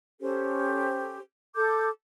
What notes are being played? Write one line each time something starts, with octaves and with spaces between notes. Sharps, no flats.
C#4 G4 A4 C5
A4 D6 G6